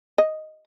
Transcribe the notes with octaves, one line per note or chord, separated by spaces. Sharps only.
D#5